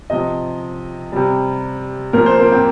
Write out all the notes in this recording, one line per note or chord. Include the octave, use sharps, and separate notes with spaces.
C3 F3 D#5
C3 G3
A#2 F3 A#4
C5
A#3
C4